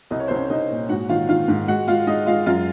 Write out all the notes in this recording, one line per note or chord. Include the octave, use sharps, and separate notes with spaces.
C2 D#5
C#5
C2 C5
C#4 C#5
C2 D#4 D#5
A#2
G#2 F#4 F#5
D#3 F4 F5
D#3 F4 F5
G#2
G#3 F#4 F#5
G#3 F4 F5
G#3 D#4 D#5
G#3 F4 F5
F#2 F4 F5